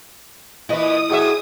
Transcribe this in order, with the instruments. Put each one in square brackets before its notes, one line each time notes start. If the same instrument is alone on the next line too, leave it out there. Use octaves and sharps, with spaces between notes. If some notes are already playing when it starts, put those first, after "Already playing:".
[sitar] A#2 E3 B4 [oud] E4 D#5 [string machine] D#6
[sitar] A2 F#4 E5 [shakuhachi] G#4